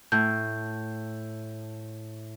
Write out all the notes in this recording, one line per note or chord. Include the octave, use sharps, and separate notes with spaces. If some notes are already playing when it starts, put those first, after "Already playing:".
A2 G6